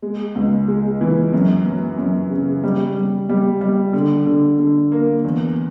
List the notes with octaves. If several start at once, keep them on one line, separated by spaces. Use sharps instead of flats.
G#3
C#2
G#3
E3
F#2
F#3
F#2
C#3
G3
G3
G3
G3
D3
D3
D3
A#3
E2